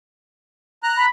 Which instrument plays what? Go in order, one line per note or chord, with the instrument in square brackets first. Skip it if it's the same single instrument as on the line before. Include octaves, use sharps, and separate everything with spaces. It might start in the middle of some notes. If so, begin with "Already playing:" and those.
[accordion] A#5 F#6
[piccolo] B5